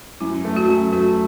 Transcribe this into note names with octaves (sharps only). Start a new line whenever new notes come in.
F#2 E4
A3
F#4
F#2
A3 F#4